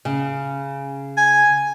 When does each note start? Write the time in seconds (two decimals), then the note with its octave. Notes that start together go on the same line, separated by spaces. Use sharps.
0.05 C#3
1.18 G#5